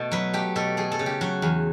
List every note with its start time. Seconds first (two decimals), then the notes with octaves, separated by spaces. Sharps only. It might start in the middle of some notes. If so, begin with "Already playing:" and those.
Already playing: B2 A3 A4
0.11 F#3 B4
0.34 A3 G4
0.56 B2 A4
0.77 A3 G#4
0.92 A4
0.99 C#3
1.06 G4
1.21 F#3 F#4
1.42 E2